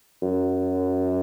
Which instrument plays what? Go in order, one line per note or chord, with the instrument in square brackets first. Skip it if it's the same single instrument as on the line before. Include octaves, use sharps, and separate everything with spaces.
[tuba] F#2